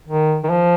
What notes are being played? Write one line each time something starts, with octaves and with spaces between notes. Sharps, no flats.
D#3
D#3
F3